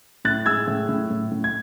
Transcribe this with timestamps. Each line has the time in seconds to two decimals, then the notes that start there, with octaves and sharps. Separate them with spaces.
0.25 A2 F#6 A6
0.46 G#3 E6 G#6
0.67 A2
0.89 A2
1.10 A2
1.32 A2
1.44 G#6